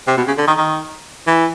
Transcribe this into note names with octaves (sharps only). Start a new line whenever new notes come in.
C3
B2
C#3
D3
D#3
D#3
E3